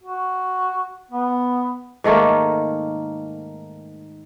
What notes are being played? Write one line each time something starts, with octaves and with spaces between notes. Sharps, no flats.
F#4
B3
G#2 D#3 A3 A#3